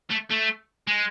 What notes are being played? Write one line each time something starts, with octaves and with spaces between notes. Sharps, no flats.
A3
A3
G#3